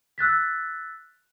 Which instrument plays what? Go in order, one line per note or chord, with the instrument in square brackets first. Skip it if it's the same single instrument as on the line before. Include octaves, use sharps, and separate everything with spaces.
[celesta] E6 F#6 A6 B6